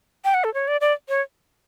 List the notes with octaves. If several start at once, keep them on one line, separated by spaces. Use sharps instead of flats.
G5
F#5
A4
C#5
D5
D5
C#5